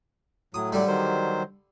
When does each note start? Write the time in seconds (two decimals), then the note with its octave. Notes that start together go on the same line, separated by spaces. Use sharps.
0.54 A2 F#3 D#6
0.72 D3 G3
0.87 D#3 F#3 C5